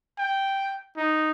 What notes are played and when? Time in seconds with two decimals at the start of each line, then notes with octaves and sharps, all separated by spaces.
0.18 G5
0.97 D#4